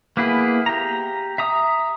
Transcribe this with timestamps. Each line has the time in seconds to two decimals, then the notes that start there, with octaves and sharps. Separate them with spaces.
0.17 A#3 B3 E4 G#4 B4
0.66 G4 A#5
1.38 E5 A#5 D#6